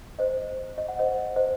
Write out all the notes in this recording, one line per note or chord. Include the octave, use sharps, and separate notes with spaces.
C5 D#5
D#5
F#5
C5 D#5
C5 D#5